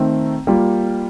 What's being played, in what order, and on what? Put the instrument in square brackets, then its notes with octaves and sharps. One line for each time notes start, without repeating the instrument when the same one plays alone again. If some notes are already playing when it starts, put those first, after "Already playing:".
Already playing: [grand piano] D#3 A3 C4
G3 A#3 F4